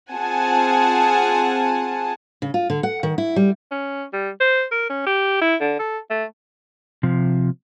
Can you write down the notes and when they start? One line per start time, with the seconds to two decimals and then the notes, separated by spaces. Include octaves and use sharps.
0.12 C4 F4 G#4 F#5 G#5 A5
2.42 C#3
2.54 F4
2.70 D3
2.83 F#5
3.03 D#3
3.18 E4
3.36 G3
3.71 C#4
4.13 G3
4.40 C5
4.72 A#4
4.90 C#4
5.07 G4
5.42 E4
5.61 D3
5.79 A4
6.10 A3
7.03 C3 F3